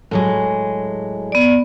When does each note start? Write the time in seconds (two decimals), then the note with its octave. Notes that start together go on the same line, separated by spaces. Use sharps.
0.11 A2 F#3 G#3
1.32 B3 D5